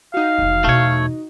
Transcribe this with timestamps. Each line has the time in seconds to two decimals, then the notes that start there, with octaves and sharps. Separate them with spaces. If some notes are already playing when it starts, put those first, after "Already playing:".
0.14 D#4 F#4 F5
0.38 F1 E3
0.64 E2 B2 A3 C#5